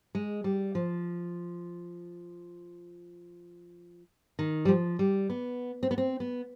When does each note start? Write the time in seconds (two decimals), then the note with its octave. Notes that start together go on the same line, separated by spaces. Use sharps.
0.15 G#3
0.44 G3
0.75 F3
4.39 D#3
4.65 G3
4.68 F3
4.99 G3
5.30 B3
5.83 C4
5.91 B3
5.98 C4
6.20 B3